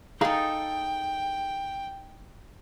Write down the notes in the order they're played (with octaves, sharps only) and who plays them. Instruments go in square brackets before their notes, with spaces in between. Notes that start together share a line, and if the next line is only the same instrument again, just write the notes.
[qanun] D#4 A4 [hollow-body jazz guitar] G#4 F5 A#5 [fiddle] G5